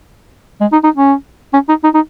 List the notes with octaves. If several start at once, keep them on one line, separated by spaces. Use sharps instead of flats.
G#3
D#4
D#4
C#4
C#4
D#4
D#4
D#4